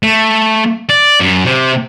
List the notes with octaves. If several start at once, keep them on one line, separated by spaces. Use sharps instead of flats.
A3
D5
F#2
C3